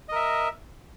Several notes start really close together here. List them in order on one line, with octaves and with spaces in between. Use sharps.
D#5 A#4 E5